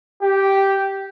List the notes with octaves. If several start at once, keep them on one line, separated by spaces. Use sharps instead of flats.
G4